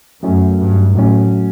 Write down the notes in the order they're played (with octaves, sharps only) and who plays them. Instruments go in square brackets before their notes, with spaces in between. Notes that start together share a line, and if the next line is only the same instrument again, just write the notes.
[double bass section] F#2 [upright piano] F#3 A3 C#4
[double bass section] G2
[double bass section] A2 [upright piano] F#3 A3 C#4